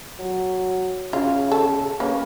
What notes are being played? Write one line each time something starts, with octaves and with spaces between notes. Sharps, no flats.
F#3
C#3 F4
A4
A#3 C#4 B4